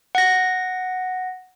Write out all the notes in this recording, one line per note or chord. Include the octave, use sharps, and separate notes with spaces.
F#5 A#6